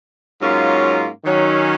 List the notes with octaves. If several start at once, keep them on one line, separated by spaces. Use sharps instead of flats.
G#2 F#3 A#3 C#4 F4
D#3 F#3 C#4